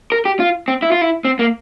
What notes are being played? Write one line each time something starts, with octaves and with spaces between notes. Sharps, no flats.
A#4
G4
F4
C4
E4
F4
E4
C4
A#3